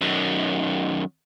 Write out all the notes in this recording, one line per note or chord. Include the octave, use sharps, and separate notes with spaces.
F#2 D#3